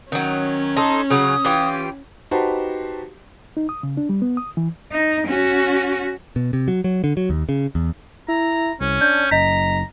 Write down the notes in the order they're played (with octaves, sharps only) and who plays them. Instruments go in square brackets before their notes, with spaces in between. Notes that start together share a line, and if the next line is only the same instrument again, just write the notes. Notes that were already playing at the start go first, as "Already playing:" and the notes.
[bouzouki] D#3 F#3 [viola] C#4
[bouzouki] D#4 A4 [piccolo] C6
[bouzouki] C#3 F#3 [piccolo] D#6
[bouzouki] E3 F4 G4
[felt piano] D#4 F#4 G4 B4 C5 A5
[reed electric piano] D#4
D#6
C#3
D4
G3
B3
D#6
E3
[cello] D#4
C#4 F#4
[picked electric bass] B2
C3
F#3
F#3
D3
F#3
D#2
C#3
E2
[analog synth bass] E4 [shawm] A#5
[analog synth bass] C2 [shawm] C#4
[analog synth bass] D4 [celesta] G6
[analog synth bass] F#1 [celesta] D#5 B6 [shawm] A#5